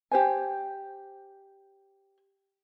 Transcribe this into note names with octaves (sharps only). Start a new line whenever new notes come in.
G4 C5 G#5